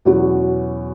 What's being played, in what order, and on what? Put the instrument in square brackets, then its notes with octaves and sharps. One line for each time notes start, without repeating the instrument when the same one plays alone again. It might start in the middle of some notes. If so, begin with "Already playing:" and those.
[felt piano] E2 B2 F#3 C#4 F#4